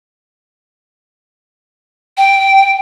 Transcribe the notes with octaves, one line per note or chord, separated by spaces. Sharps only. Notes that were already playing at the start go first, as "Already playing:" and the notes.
G5